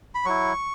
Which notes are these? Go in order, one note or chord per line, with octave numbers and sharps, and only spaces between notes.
B5
F#3 E4 C#6